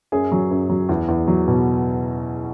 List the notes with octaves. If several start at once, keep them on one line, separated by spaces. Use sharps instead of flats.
F#2 G#4
F#3
F#2
F#3
E2
E2
F#3
B2